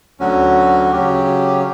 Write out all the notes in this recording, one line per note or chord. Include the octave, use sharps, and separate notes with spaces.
D2 D3 F#3 C#4 F#4
C#3 F#3 C#4 G4